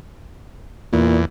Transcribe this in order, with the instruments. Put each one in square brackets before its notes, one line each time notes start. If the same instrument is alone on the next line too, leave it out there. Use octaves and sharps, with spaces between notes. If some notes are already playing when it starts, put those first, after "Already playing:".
[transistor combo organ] E2 [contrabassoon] A#2